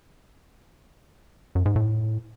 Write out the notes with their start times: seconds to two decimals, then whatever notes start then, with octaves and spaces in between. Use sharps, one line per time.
1.55 F#2
1.66 G#2
1.76 A2